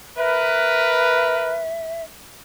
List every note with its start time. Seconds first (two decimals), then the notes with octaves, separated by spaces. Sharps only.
0.17 A#4 B4 E5